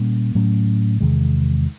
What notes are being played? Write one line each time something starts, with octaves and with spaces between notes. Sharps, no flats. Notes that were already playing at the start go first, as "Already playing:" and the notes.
Already playing: A#2 G3 A#3 C#4
A2 F#3 A3 C#4
E2 C3 D#3 G#3